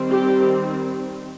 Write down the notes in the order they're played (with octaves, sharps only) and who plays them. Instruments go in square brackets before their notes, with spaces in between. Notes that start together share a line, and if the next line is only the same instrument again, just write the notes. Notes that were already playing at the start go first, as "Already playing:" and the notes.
Already playing: [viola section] D#3 G3 C4
G4